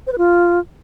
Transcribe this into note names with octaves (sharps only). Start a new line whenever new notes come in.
C5
B4
F4